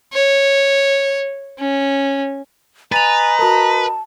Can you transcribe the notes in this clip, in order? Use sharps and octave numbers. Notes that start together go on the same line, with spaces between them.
C#5
C#4
B4 D#5 G#5 A#5 A6 D#7 F7
F#4 A#4 A5